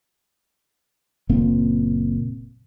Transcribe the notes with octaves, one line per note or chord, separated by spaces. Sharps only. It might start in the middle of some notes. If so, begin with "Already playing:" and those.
F#1 A#2 A#3 C4